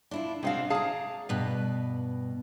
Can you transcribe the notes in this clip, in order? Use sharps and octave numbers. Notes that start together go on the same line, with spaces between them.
D4 E4 F4
C3 G#3 C4 D4 F#4 F5
G#4 D5 F5 A5 A#5
G2 B2 B4